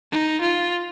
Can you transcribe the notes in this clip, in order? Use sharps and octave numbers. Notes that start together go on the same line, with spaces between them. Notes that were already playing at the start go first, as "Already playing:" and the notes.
D#4
F4